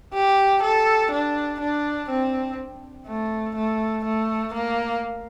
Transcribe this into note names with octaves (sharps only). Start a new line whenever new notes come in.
G4
A4
D4
D4
C4
A3
A3
A3
A#3